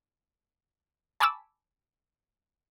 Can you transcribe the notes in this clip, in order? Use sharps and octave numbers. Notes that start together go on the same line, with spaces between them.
G#5 A5 B5 C#6 D6 E6